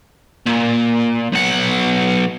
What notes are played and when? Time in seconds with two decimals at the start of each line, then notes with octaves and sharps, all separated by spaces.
0.47 A#2
1.33 B1 F#5